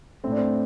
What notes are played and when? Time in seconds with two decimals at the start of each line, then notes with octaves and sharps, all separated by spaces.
0.24 A3 C4
0.27 A2 D4
0.38 C4